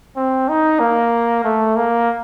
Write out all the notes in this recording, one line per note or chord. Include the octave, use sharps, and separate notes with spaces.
C4
D#4
A#3
A3
A#3